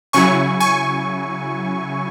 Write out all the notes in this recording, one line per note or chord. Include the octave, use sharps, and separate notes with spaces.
C#3 F#3 E4 G#5 C#6
G#5 C#6